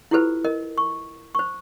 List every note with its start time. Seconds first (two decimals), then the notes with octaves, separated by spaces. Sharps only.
0.11 E4 F4 G4 A4 B4 C5
0.44 A#4 D#5
0.78 C#6
1.35 C5 C#6